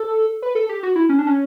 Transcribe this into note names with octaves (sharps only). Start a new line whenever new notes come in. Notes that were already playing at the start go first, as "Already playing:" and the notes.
Already playing: A4
B4
A4
G4
F#4
E4
C#4
D4
C#4